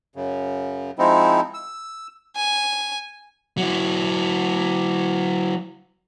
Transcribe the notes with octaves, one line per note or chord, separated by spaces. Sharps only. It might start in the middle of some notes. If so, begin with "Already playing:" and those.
F#2 C#3
F3 G#3 C4 D#4 E4
E6
G#5
F#3 E4